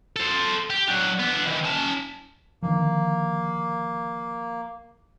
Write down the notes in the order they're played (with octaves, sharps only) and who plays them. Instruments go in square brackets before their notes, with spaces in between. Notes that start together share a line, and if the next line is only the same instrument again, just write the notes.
[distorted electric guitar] A4 C5
G4
F#3 D4
B3 D4
D#3 E3
C#4 A5
[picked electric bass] D3 D#3 F3 [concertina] A#3